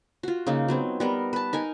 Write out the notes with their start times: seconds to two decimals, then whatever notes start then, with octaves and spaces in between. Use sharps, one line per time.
0.23 F4 F#4
0.47 C#3 A#3 D#4
0.68 F#3 B3 C4
1.00 G3 B3 A#4
1.33 B4 A5
1.53 D#4 A#4 G#5